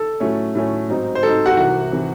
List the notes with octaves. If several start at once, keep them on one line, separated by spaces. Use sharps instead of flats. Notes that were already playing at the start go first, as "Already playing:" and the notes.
Already playing: A4
A2 F#3 A3 C#4
A2 F#3 A3 C#4
G#2 F#3 C4 D#4
C5
G#2 F#3 C4 D#4 A4
F#4 F#5
C2 C3 E3 F#4 F#5
C3 E3